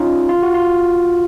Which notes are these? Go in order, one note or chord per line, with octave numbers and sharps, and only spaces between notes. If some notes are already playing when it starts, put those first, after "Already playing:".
Already playing: C#4 D#4 F4
F4
F#4
F4